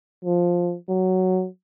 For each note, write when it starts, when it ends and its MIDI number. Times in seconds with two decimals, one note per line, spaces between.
0.25 0.76 53
0.89 1.47 54